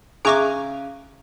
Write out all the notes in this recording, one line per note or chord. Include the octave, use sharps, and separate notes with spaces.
C#3 G#4 E5 G#5 A#5 C#6 D6 F#6